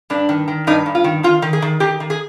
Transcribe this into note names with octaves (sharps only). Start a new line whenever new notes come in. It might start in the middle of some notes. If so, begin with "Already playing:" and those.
G2 D4
D#3
D#3
G2 D#4
G2
F4
D#3
D#3 F4
D#3
G#4
D#3
D#3 G4
D#3
G#4